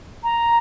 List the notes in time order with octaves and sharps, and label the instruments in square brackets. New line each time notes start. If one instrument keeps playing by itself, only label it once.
[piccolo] A#5